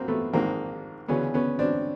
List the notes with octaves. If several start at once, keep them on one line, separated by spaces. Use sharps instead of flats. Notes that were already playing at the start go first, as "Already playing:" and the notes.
Already playing: B1 A2 A#3 C4
A3 B3
A#1 G#2 D#3 A#3 C4
D2 C#3 E3 B3 C#4
B3 C#4
C4 D4